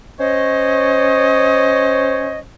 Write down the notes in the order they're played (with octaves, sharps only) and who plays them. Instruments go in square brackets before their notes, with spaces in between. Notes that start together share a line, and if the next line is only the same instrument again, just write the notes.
[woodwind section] C#4 C5 C#5 D#5